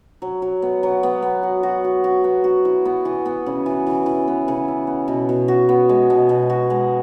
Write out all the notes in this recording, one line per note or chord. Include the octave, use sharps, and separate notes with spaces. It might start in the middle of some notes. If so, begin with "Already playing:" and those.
F#3
F#3
B3
F#3
B3
B3
F#4
F#4
F#4
F#4
B3
F#4
E4
B3
E3
B3
C#3
E3
E3
E3
B3
C#3
E4
B3
B2
B2
F#4
B3
G#3
B2
B2
F#4
G#3